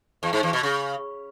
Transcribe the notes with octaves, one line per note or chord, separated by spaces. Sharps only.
E2
G#2
E2
B2
C#3